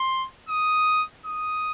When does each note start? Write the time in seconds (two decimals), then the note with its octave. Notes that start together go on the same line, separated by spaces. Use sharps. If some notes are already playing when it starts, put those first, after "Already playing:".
Already playing: C6
0.49 D#6
1.25 D#6